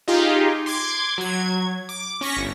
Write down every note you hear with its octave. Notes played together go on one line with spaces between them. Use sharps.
D#4 F4 G4 G#4
C6 D6 G#6
F#3 G#6
D6
C#4 C#6 A#6 B6
G1